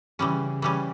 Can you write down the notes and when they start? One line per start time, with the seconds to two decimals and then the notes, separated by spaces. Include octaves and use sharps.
0.19 C#3 E3 G3 C#4
0.62 C#3 E3 G3 C#4